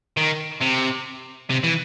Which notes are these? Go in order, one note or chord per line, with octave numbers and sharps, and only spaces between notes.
D#3
C3
C3
E3